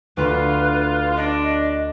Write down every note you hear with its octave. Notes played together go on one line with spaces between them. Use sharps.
D2 F4 B4 B5 B6
D4 D#5